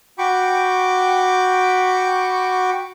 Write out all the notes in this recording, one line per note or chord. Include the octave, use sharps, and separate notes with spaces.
F#4 G5 B5 C#6 D6